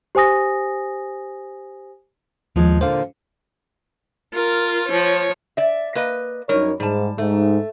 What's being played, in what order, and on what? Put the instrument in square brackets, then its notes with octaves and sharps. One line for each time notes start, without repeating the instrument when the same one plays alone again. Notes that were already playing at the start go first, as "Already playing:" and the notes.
[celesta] G4 C5 G#5 D#6 A#6
[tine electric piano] D#2 [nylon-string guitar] F3 G#3
[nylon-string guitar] A#2 D3 [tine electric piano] C5 F5
[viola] F4 A#4
F3 C#5
[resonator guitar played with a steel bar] D5 E5
A#3 B4 D#5
[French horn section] F#2 D#4 C#5 [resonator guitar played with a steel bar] G3 A#4
[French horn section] G#2 [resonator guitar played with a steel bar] G3 A5
[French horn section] G#2 [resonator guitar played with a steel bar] A3